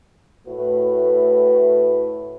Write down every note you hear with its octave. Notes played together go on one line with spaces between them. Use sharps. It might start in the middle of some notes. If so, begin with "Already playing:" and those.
A2 A3 F#4 B4